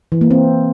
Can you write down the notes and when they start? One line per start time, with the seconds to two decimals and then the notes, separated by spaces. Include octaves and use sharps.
0.12 E3
0.21 A#3
0.31 C4